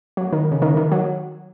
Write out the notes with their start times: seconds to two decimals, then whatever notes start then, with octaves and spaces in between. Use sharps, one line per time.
0.17 F#3
0.33 D#3
0.52 C#3
0.62 D#3
0.77 D#3
0.92 F#3